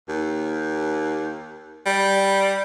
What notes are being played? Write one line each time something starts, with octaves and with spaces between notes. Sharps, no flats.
D#2
G3